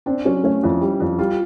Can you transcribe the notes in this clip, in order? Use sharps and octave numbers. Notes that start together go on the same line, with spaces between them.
C4 D4
F#3 C#4
A3 C#4
F2 E4
G3
F2
G3 F4